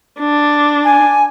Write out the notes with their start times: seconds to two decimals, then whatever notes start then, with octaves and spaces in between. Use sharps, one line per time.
0.20 D4
0.85 G#5